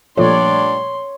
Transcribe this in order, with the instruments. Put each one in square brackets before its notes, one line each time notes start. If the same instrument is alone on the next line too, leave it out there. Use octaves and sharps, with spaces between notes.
[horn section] G2 D4 D5 [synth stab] A#2 F3 A3 [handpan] C#5 [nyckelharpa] C6